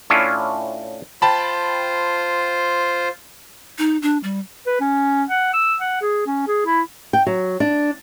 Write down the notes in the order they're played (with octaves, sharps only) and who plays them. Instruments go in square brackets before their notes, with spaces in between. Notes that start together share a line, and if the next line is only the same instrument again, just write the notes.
[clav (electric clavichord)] A2 C#4 D4 E4 F4
[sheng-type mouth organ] F4 C5 [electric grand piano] G5 A5 B5
[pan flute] D#4
D4
G3
[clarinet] B4
C#4
F#5
E6
F#5
G#4
C#4
G#4
E4
[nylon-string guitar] G5
F#3
D4